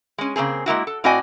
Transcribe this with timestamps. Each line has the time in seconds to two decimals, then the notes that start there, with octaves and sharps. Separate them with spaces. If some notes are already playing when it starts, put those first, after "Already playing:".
0.18 G#3 C#4
0.36 C#3 A#3 C4 G#4
0.66 G#3 A#3 E4 F#4
0.87 A4
1.04 A2 C4 F#4 D5 D#5 G#5